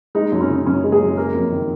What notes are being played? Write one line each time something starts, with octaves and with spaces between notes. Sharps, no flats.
G#3 D#4
F#2
C#4
C#3
F#2 C#4
G#3
G#4
F#2
A#3 A#4
F2
D#3